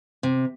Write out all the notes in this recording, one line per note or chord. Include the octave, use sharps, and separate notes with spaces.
C3